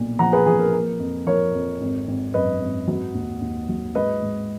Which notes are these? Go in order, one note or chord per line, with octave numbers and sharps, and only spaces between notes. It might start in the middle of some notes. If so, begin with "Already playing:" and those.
Already playing: B1 A#2
F3 F#5 A#5
G#4 B4
F3 G#4
A#4
A#3 A#4
F2
F3 A#4 C#5
F2
G#1
G#1
F#2 B4 D#5
G#1
F#3
D#2
D#2
F#3
G#2 B4 D#5
G#2